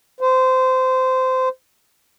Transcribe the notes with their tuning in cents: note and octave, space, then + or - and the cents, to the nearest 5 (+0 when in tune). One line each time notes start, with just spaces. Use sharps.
C5 -20